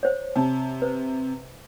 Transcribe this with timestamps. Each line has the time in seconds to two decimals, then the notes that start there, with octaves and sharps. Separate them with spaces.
0.03 C5 C#5
0.36 C3 A5
0.82 B4 C5